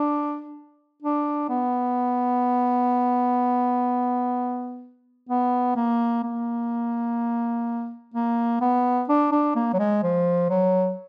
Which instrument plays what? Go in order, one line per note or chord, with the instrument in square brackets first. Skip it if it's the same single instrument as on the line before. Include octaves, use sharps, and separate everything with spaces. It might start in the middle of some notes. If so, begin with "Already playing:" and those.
Already playing: [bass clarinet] D4
D4
B3
B3
A#3
A#3
A#3
B3
D4
D4
A#3
F#3
G#3
F3
F#3